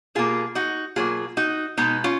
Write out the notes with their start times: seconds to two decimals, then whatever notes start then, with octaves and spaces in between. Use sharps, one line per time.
0.15 B2 A#3 F4 G#4
0.55 D#4 F#4
0.96 B2 F#3 A#3 F4 G#4
1.37 D#4 F#4
1.78 B2 G#3 B3 D#4
2.04 C#4 F4